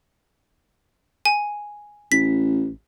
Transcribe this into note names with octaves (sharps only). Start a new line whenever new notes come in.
G#5
A1 B6